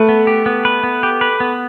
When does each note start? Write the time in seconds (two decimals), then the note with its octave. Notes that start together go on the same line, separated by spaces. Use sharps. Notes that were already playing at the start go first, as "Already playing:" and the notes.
Already playing: A3 B4
0.09 B3
0.27 G4
0.46 B3
0.65 B4
0.84 B3
1.03 G4
1.21 B4
1.40 B3